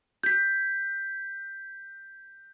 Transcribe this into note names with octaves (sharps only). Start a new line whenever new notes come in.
G6 B6